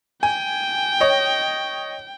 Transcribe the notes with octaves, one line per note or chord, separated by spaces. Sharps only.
G5 G#5
C#5 D#5